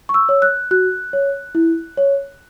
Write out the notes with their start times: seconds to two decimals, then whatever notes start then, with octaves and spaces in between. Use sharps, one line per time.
0.09 C#6
0.14 E6
0.29 C#5
0.42 F#6
0.71 F#4 F#6
1.13 C#5
1.55 E4
1.97 C#5